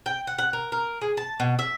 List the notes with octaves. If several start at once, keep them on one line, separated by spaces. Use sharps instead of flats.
G5
F#5
F#5
A#4
A#4
G#4
A5
B2
E5